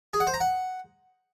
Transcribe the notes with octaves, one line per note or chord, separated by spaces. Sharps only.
G#4
F#5
C5
A#5
F#5